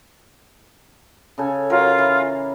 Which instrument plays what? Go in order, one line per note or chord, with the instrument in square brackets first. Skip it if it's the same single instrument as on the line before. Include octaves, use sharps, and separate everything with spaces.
[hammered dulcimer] C#3 A4 G#5
[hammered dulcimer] F#3 A#4 A#5 [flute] F4
[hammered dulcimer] E3